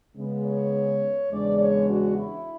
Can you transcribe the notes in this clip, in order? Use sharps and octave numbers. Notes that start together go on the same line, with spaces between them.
C#3 G#3 B3
C#5
E2 C#3 G#3 D4 D5
C#5
F#4
E4